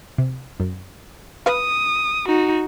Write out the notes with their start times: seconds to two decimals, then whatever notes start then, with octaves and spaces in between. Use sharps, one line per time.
0.18 C3
0.60 F#2
1.46 B4 F5 D#6
2.28 D#4 F#4